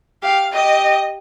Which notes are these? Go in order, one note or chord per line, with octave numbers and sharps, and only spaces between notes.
G4 F5
G4 D#5